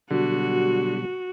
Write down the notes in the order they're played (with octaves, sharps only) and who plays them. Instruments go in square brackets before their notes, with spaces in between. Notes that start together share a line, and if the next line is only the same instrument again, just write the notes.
[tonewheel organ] B2 F#3 G3 [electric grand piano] D3 [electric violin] F#4